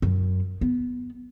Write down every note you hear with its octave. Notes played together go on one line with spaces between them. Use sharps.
F#2
B3